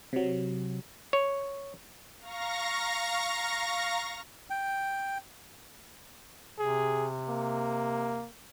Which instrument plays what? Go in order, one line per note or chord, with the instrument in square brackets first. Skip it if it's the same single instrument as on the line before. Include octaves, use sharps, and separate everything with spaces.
[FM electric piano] C3 F#3
[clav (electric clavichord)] C#5
[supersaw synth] F5 A#5 C#6 A#6
[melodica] G5
[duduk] C3 [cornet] G#4
[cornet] A#3